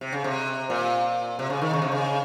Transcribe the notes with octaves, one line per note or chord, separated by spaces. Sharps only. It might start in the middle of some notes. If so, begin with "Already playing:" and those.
C3
C#3
C3
A#2
C3
C#3
D#3
C#3
C3
C#3